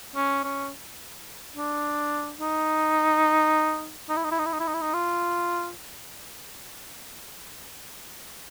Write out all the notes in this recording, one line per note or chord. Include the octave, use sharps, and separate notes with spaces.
C#4
C#4
D4
D#4
D#4
E4
D#4
E4
D#4
E4
D#4
E4
D#4
E4
D#4
F4